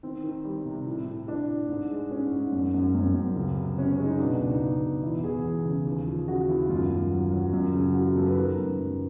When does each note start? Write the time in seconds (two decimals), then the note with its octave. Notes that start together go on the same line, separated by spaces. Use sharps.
0.03 D#3 C4
0.24 D#3
0.45 G3
0.65 C3
0.86 A2
1.06 A2
1.27 A2 D4
1.49 A2
1.69 G#2
1.90 G#3
2.11 G#2 C#4
2.31 G#2
2.52 F#2
2.74 F#2
2.94 F#2 C4
3.15 F#2
3.36 C#2
3.56 C3
3.77 C3 C#4
3.91 C#4
3.98 G#3
4.05 D#4
4.19 B2 D4
4.40 C#2
4.50 D#4
4.60 C#2
4.81 B2
5.03 E2 E4
5.24 E2 G#4
5.44 E2
5.65 C#3
5.86 D#2
6.06 F3
6.28 C#3 F#4
6.49 D#2 E4
6.69 F#2 F4
6.90 F#2
7.10 F#3
7.32 F#3
7.53 F#2
7.74 C#3
7.94 E3 F#4
8.04 G#4
8.15 F#2 A4
8.26 B4
8.36 D#3 A#4
8.57 F#2
8.78 F#2